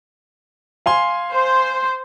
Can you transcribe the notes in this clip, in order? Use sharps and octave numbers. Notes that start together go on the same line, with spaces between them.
F5 G#5 C6
C5